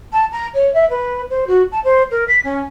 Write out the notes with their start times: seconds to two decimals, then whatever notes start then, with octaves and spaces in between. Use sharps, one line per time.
0.12 A5
0.32 A#5
0.54 C#5
0.73 E5
0.89 B4
1.30 C5
1.47 F#4
1.71 A5
1.84 C5
2.11 A#4
2.28 B6
2.44 C#4